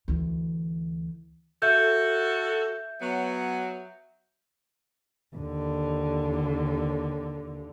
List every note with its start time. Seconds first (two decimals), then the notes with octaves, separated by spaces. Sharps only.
0.08 D2 E3
1.62 F#4 A4 E5 G6
3.01 F#3 B3
5.36 D#2 D3